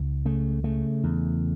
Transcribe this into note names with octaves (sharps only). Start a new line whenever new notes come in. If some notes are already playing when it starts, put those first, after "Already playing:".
Already playing: C#2
C#3 A3
C#3 A3
E2